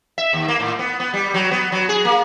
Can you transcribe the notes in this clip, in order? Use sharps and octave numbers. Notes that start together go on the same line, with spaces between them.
E5
D#2
A#3
A2
B3
B3
G3
F#3
B3
F#3
G#4
A#3